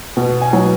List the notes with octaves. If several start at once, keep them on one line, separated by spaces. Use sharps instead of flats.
B2
G#5
F#3